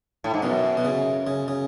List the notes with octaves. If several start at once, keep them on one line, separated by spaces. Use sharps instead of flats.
A2
G#2
F#2 B2
B2
C#3
C#3
C#3